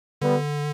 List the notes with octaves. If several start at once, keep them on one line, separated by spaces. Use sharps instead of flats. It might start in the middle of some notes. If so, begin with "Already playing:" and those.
D3 G3 B3